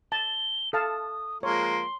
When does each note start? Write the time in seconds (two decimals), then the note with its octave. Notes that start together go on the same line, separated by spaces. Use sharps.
0.12 A5 G7
0.73 A4 F5 A5 D#6
1.43 F3 G#3 A#3 C#5 C6